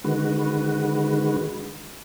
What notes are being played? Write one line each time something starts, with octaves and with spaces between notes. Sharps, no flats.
D3 D#3 G#3 F#4 B4